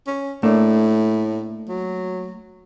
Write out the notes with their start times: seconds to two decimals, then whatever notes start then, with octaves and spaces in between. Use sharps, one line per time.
0.07 C#4
0.43 A2 A3 A#3 D4
1.68 F#3